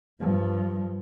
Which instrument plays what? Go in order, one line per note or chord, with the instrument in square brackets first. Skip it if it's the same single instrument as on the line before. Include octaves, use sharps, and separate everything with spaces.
[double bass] G2 F3